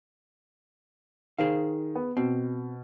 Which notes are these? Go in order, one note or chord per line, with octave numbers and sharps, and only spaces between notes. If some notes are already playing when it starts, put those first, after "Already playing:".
D#3 G#4 C5 F5
B3
B2 C4